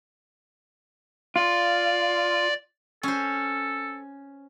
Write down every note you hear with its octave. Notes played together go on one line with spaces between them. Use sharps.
F4 D5
C#4 A4 C5